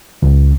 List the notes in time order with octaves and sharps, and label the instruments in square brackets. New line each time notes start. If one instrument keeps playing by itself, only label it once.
[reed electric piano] C#2